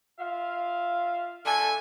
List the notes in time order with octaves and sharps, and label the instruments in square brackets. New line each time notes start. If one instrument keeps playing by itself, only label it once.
[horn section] F4 E5 F5
[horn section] D3 A3 A4 [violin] G#5